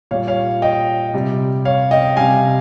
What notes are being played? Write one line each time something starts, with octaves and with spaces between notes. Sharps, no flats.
A#2 G3 C#5 F5
C#5 F5
D#5 G5
C3 G3
C#5 F5
D#5 G5
C3 G3 F5 G#5